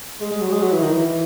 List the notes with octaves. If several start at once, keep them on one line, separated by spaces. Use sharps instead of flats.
G#3
G#3
F#3
G#3
F#3
E3
D#3
E3